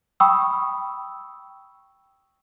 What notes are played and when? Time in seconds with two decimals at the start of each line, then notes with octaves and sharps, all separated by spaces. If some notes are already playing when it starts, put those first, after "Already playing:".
0.20 G5 B5 C#6 D#6 E6